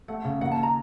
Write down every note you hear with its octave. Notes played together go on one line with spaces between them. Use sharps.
A3 F#5
C#3
D#2 F#5
A5
A#5